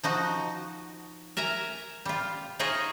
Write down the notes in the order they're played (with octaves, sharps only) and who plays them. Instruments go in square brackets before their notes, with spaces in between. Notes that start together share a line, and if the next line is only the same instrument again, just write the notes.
[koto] F3 D#4 F#4
A#4 E5 G#5 A#5
G3 F4
D#4 F4 G#4 C#5 D#5 E5